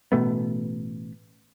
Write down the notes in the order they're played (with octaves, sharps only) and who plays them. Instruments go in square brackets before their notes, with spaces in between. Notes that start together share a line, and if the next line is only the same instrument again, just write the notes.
[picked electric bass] A1 B2 A3 B3